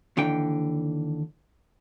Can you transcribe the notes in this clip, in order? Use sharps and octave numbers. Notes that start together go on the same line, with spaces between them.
D#2 D3 E3 G5